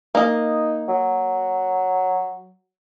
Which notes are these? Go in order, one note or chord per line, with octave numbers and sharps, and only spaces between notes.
A#3 D#4 D#5
F#3